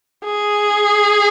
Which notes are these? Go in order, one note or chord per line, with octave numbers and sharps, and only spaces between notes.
G#4